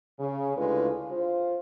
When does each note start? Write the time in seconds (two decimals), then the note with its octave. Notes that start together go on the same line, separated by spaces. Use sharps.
0.20 C#3
0.56 D2 G#3 E4 F4 B4
1.11 F4 C5